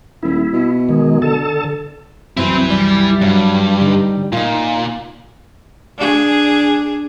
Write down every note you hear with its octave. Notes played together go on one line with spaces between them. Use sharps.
D#1 E4
B2
D#3 G#3
D3 A4 A5
C2 F#2 C4 E4 B4
G3
G2 F#3
D3 D#4
A#2 D#4 F4
D4 G#4